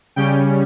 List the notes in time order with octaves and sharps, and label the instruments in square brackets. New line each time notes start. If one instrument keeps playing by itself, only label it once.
[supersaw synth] C#3 G3 C#4 G5